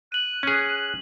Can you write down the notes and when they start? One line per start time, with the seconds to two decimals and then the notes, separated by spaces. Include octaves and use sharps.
0.12 F#6 D#7 F#7
0.43 C#4 G#4